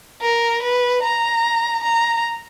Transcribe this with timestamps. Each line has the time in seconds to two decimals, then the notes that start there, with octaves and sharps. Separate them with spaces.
0.22 A#4
0.63 B4
1.03 A#5
1.84 A#5